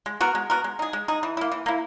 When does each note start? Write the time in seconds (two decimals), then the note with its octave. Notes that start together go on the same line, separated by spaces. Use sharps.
0.06 G#3
0.21 B3 F#4 A#4
0.35 G#3
0.50 B3 F#4 A#4
0.64 G#3
0.79 D#4 G#4
0.93 G#3
1.08 D#4 G#4
1.23 E3
1.37 A#3 E4
1.52 E3
1.66 A#3 E4